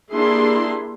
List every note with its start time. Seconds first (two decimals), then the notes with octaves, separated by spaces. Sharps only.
0.14 A#3 D4 E4 G4 G#4 C6